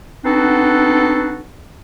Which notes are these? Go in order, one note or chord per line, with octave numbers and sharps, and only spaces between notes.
B3 C4 D4 D#4 F#4 A4